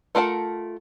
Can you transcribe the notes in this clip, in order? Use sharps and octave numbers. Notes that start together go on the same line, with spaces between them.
A3 F4 A#4 F#5 A5